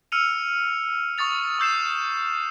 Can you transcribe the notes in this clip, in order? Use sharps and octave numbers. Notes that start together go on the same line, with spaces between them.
E6 F6 C#7 D#7 F7
C#6 D#6 A6 F7
C#6 E6 G6 C7 E7